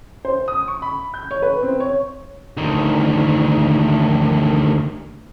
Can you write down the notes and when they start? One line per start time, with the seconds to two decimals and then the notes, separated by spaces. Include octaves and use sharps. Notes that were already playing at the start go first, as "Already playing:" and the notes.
0.25 C5
0.48 D#6
0.68 C#6
0.82 B5
1.14 G6
1.31 C#5
1.42 B4
1.63 C4
1.80 C#5
2.57 D2 D#3